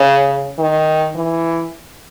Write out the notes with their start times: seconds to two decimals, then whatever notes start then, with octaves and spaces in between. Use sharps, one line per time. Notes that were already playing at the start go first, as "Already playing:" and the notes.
Already playing: C#3
0.59 D#3
1.16 E3